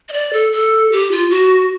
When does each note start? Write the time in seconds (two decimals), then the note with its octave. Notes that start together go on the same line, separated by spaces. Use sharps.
0.09 D#5
0.13 D5
0.33 A4
0.52 A4
0.92 G4
1.12 F4
1.30 F#4